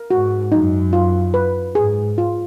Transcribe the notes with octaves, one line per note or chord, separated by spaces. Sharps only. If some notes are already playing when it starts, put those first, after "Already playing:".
Already playing: A#4
G#2 F#4
F#2 D#4
F4
B4
G#2 G#4
F4